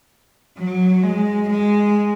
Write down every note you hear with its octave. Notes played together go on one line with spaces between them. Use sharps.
F#3
G#3
G#3